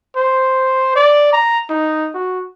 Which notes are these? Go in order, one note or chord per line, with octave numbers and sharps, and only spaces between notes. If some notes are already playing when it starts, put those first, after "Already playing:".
C5
D5
A#5
D#4
F#4